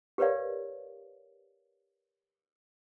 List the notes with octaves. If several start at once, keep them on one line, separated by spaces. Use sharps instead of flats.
G4 A#4 B4 C#5 D5 F5